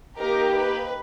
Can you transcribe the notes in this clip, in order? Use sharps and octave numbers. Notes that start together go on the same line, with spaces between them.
A#3 D#4 G4 A#4
B4